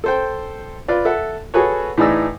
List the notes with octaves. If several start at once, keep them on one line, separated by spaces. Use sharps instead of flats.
A4 C5 G5
F4 B4 D5
A4 E5 F#5
F#4 G#4 A4 B4 C#5
A2 E3 D#4 G#4 D5 E6